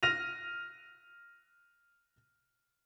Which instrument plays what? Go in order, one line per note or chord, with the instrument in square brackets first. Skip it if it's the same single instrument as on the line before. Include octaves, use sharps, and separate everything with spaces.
[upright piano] F6 A#6 D#7 F7